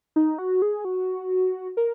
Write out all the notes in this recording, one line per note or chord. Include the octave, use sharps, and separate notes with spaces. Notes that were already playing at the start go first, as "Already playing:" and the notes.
D#4
F#4
G#4
F#4
A#4